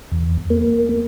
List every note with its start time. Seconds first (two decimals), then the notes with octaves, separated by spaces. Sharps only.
0.11 E2
0.50 A#3